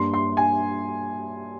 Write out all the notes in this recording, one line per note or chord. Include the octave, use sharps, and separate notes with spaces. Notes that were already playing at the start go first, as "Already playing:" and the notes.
Already playing: G2 G3 A#3 C6
C6
G#5